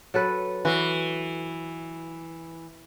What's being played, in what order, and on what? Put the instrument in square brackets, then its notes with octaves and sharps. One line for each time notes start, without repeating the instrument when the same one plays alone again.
[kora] F#3 A4 B4
[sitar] E3 [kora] F#4